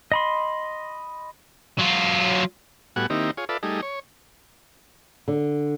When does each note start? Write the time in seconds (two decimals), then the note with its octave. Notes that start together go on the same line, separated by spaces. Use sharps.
0.12 D#5 B5 C6
1.79 F#3 F4
2.96 A2 G3 B3 F#4 F#5 G#5
3.10 D#3 A#3 C4 D#4 E4 G4
3.37 F4 G#4 C#5
3.49 F4 A4 B4 D5 E5
3.63 G3 A3 D#4 G#4
3.83 C#5
5.28 D3